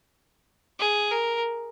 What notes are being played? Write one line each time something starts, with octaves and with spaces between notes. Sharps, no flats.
G#4
A#4